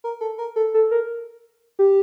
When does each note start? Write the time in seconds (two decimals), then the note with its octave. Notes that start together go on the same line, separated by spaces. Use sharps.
0.04 A#4
0.21 A4
0.38 A#4
0.56 A4
0.74 A4
0.91 A#4
1.79 G4